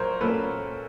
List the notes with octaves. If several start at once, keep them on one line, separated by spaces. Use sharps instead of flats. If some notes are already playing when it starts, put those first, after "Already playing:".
Already playing: A#2 F#3 A#4 C5 C#5
A#2 F#3 A#3 C#4 A4 B4